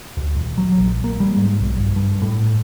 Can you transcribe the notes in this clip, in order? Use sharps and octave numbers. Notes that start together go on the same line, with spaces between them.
D2
D#1
F#3
A#1
A#3
G3
G#2
B1
G1
G2
A2